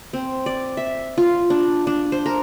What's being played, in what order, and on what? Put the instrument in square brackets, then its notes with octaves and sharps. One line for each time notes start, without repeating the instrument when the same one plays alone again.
[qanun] C4
D5
E5
F4
D4
D4
C5
A#4